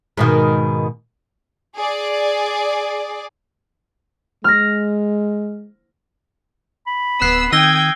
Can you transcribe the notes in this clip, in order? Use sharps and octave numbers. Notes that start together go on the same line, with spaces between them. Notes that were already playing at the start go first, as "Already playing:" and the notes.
G#2 B2 D#3
G#4 D5
G#3 F6 A#6
B5
D1 B3 E6 F#6 C7
D#3 C4 G5 D#6 E6 G#6 A#6 G7